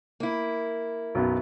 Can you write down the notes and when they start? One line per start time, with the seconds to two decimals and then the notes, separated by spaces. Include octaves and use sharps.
0.20 A#3 E4
1.15 B1 F#2 B3